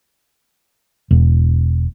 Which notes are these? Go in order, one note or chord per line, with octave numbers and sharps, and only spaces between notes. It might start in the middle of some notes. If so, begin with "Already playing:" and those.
E1